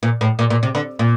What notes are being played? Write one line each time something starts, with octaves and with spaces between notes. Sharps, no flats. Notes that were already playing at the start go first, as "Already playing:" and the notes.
A#2
A2
A#2
A#2
C3
D3
A#2